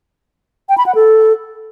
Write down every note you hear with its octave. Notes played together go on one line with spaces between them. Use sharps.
G5
B5
F#5
A4